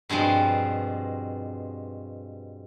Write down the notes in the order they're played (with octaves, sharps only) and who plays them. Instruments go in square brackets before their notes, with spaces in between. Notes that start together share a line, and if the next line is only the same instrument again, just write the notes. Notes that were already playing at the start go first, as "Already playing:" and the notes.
[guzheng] G2 B2 F3 G#3 C4